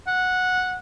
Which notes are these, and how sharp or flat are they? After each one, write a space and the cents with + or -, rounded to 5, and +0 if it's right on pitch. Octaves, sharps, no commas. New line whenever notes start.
F#5 -10